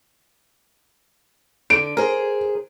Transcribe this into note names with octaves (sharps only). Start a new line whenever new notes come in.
D3 D7
G#4 A#4 C5